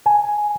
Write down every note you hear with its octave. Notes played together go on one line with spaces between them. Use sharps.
G#5